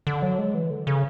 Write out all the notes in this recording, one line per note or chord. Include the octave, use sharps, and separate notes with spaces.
D3
F#3
G#3
E3
D3
C#3